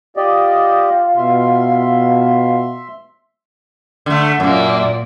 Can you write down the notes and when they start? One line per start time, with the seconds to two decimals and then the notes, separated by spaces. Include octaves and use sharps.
0.17 F4 G4 D5 D#5
1.17 B2 E5 C6
4.06 D3 A3
4.40 F#2 A#2 A#3 D5